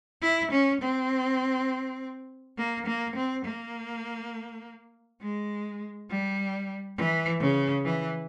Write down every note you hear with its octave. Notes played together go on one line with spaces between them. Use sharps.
E4
C#4
C4
A#3
A#3
C4
A#3
G#3
G3
E3
C#3
E3